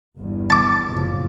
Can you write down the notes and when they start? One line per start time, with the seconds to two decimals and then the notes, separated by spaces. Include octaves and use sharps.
0.18 G1 E2
0.50 A5 D6
0.88 F#1 A2 F3